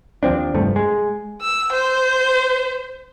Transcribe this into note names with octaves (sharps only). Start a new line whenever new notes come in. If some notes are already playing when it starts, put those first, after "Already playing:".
D#2 F3 C4 D4
F1 G2 F3 A3
G#3
E6
C5